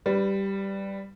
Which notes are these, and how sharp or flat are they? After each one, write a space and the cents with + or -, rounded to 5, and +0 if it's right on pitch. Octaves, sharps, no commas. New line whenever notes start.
G3 +0 B4 +15